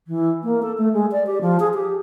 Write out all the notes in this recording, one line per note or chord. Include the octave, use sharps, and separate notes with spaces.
E3
A#3
A4
A3
G#3
D5
G4
F3
G#4
G4